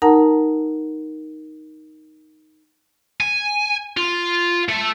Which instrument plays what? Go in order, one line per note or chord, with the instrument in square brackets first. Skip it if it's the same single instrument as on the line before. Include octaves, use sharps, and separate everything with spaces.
[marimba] D#4 A#4 F#5 A5 A#5
[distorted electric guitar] G#5
F4
A3